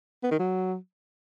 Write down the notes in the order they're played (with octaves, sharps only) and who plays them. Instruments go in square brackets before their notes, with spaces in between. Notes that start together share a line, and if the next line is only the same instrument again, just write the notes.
[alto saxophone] B3
D#3
F#3